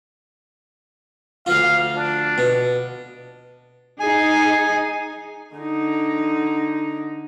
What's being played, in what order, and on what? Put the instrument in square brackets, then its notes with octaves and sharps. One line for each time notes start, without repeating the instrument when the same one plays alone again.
[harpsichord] D2 F3 F4 [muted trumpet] F5
[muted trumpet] D4
[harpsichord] B2
[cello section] D#4 G#4 [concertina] G#5
[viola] D3 D#4